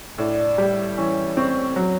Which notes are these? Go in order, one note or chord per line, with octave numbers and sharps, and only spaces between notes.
A2 D4
G3
E3 C#4
C4 C#4
F#3